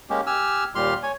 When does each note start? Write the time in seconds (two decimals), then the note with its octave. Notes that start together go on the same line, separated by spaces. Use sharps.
0.10 G#3 A#3 C#4 G4
0.27 G4 G#5 E6 F6
0.75 D#2 A#2 G3 G4 C6 F6
1.03 C#5 G#5